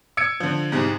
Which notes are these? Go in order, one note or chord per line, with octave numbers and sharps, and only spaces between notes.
E6 G#6 C#7 D7
D3 F3
C2 G#2